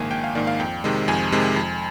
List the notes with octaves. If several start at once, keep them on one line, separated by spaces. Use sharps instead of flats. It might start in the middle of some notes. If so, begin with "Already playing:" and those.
Already playing: A#1 G#2 D#3 A#3 G#5
A#1 G5
F5
G#2 D#3 A#3 D5
F5
F2 G5
C3 D#3 G#3
F2 G#5
C3 D#3 G#3
F2